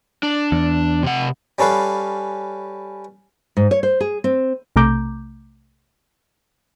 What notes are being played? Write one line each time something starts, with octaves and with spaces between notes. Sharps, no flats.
D4
E2
C3 F#5
G3 C#4 A4 B4 F5
G#2
C#5
C5
G#4
C4
B1 C3 A3 A#5 D6 G6